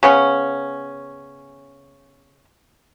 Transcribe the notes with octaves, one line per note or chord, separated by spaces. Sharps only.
C#3 B3 C#4